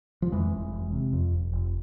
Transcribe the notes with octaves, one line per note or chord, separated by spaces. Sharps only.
F3
F2 E3 G#3
F1
F1
C3
F2
F1
F1